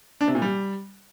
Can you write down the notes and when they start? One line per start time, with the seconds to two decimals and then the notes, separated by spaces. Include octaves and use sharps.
0.21 D4
0.28 C3
0.35 A#2
0.42 G3